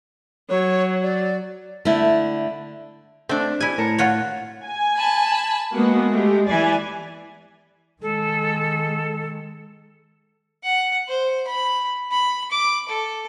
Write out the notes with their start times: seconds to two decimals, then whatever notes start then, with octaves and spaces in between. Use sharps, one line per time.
0.49 F#3 C#5
1.03 D5
1.85 D3 A3 E4
3.29 A3 C4 D4
3.60 G3 E4 G#5
3.78 A2 A#4 A5 C#7
3.98 F4 F#4 C#5
4.63 G#5
4.96 A5 B5
5.72 G#3 A#3 B3 F#4
6.11 A3 G4
6.48 E3 D5 G#5
8.02 D#3 G#3 A4
10.63 F#5
11.08 C5
11.47 B5
12.11 B5
12.51 D6
12.88 A4